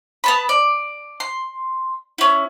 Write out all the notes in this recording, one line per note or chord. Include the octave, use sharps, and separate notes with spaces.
B3 A5 B5
D5
C6
C#4 E4